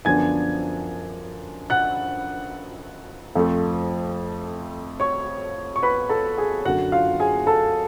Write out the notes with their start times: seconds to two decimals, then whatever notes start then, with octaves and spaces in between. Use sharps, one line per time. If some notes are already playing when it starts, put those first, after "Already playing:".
0.05 F#2 D3 F3 B3 D4 G#5 G#6
1.70 F#5 F#6
3.35 F2 F3 A3
5.00 C#5 C#6
5.76 C#6
5.83 B4 B5
6.09 A4 A5
6.38 G#4 G#5
6.65 F#2 D3 F#3 F#4 F#5
6.92 F4 F5
7.20 G#4 G#5
7.47 A4 A5